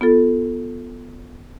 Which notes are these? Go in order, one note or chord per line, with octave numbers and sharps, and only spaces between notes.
B3 F4 A4